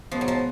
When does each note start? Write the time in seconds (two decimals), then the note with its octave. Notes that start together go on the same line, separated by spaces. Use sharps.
0.11 B2 F3 G#3 B3 D#4
0.21 F#3
0.28 F3